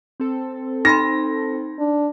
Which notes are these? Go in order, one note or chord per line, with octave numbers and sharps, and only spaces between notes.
C4 A4
D#4 B5 C6 A#6
D4